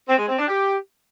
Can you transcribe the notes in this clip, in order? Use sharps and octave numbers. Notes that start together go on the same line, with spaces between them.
C4
G#3
C4
D4
G4